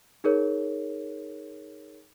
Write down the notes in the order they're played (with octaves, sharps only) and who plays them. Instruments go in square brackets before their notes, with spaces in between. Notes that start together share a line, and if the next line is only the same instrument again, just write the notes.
[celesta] D#4 G#4 A#4 C#5